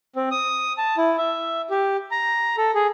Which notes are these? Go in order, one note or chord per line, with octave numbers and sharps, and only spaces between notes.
C4
D#6
A5
E4
E5
G4
A#5
A4
G#4